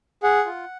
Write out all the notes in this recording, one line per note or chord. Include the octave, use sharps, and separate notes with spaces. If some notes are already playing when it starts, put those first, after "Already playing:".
G#4 F#5
F4